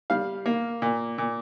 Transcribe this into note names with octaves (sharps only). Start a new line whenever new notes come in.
G3 F5
A#3
A#2
A#2